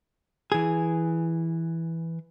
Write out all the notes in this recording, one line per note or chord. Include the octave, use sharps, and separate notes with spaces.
E3 G#4